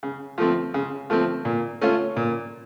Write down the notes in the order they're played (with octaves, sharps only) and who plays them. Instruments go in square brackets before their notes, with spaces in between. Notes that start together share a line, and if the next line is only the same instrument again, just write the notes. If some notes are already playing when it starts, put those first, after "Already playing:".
[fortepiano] C#3
F3 A3 C4
C#3
F3 A3 C4
A#2
A3 C#4 F4
A#2